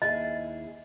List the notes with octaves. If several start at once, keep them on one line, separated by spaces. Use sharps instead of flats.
D#2 E4 G#4 D#5